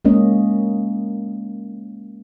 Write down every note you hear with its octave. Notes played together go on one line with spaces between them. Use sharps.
G#3 A#3 C#4 D#5